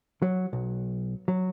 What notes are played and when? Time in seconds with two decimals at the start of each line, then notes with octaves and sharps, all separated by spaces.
0.22 F#3
0.53 B1
1.28 F#3